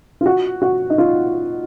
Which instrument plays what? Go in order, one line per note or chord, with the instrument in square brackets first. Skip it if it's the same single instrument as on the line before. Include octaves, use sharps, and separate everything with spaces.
[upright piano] F4
F#4
F#4
D#4
F4